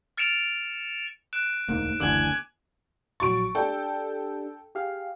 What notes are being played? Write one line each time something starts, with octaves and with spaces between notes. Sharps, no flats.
F6 A6 C#7 D7 E7 F7
F#6 D7 E7
E1 D2 G#2 A#3
F#1 D2 D3 E3 G#5 D6 F#7
A#1 F#3 C#6 A6 D7
D4 G4 A4 G5
G4 G#4 F5